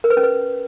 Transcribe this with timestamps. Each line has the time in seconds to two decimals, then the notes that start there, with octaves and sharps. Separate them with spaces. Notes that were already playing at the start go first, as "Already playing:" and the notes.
0.04 A#4
0.10 B4
0.17 C#4
0.23 B4